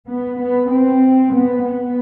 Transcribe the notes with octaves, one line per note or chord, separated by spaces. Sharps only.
B3
B3
C4
B3
B3